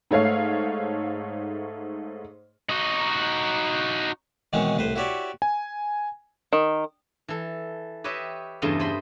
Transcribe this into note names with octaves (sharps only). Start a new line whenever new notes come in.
G#2 A3 C#5 F5 C7
D#4 F#4
B2 D#3 E3 G#3 C4 C#4
C2 A2 B4 C5
E4 F#4 G4 C#5 D5 E5
G#5
D#3
E3 A4
G4 B4 C#5 D#5 E5
E2 G2 C#3 A3 D#5 C6
C5 D#5 B5 C6